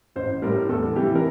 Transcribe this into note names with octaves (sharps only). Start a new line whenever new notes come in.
A1 C5
A2 G3 A#4
E2 A4
C3 E3 G3 G4
A#4